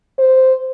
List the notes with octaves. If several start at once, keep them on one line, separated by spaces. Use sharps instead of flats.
C5